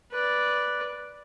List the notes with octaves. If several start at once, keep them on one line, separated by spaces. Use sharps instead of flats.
B4 D5